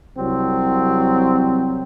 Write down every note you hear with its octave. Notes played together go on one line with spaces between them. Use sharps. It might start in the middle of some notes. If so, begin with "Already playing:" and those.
C2 F#3 C4